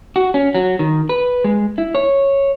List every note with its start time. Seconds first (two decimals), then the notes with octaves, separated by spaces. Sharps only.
0.16 F#4
0.34 C#4
0.55 F#3
0.79 D#3
1.09 B4
1.44 G#3
1.78 E4
1.95 C#5